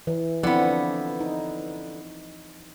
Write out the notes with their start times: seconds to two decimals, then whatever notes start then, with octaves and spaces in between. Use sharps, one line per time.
0.07 E3
0.43 D3 F3 B3 C4 E4
1.21 D#4